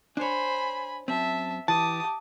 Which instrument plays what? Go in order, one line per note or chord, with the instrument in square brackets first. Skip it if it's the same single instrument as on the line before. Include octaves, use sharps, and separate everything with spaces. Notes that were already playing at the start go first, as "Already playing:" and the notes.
[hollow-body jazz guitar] D4 C#5 [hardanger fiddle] C5 [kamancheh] G#5 B5
[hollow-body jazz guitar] F#2 C4 [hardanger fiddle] E5 [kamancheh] A5
[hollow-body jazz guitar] E3 [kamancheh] G4 [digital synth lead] A5 [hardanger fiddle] D#6